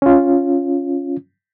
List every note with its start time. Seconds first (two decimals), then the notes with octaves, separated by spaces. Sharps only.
0.02 C#4 F4